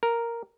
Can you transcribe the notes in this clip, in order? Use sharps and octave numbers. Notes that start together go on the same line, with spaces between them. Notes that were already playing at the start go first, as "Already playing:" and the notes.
A#4